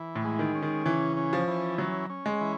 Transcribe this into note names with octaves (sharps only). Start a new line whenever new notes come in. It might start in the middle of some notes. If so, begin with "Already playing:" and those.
Already playing: E3
A2
G#3
D#3
C#4
D#3
C#3 E3
C#4
F3
E3
F#3 C#4
C#4
G#3
E3